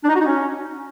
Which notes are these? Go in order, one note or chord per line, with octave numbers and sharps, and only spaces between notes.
D4
D#4
F#4
D#4
C#4